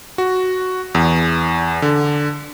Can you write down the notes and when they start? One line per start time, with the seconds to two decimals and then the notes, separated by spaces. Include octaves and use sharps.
0.18 F#4
0.95 E2
1.82 D3